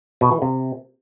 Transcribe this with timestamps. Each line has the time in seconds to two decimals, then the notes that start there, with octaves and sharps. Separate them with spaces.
0.21 B2
0.31 E3
0.42 C3